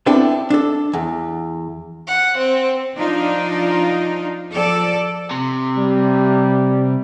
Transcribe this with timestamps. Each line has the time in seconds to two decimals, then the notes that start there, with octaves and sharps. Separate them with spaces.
0.06 B3 C4 D4 E4 A4
0.50 D4 A4
0.93 E2
2.07 F#5
2.39 C4
2.95 F3 D4 D#4 F4
4.51 F3 A4 D5
5.31 C3
5.78 G3